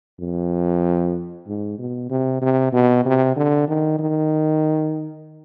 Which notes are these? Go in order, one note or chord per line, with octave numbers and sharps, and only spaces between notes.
F2
G#2
B2
C3
C3
B2
C3
D3
D#3
D#3